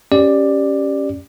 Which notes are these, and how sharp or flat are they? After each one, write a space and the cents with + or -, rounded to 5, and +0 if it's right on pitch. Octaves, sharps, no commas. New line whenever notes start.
C#4 +0 G4 +0 D5 +10